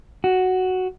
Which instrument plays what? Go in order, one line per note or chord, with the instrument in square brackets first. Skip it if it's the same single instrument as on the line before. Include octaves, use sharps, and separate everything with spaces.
[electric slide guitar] F#4